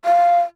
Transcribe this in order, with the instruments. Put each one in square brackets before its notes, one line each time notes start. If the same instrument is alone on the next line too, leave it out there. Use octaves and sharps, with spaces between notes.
[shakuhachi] F5